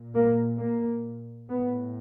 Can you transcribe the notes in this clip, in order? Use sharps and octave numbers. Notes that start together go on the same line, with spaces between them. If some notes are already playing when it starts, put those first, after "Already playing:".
Already playing: A#2
A#3
A#3
A2 B3